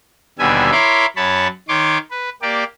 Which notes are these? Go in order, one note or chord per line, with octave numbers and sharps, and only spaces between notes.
D#2 B2 D3 G3 E5 G#5
E4 A#4 C#5 B5 C6 D6
F#2 C#5 A5 B5
D#3 C#5 C6 D6
B4
A#3 G4 D5